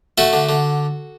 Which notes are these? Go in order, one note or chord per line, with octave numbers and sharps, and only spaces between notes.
A3 F#4 A4
D3
D3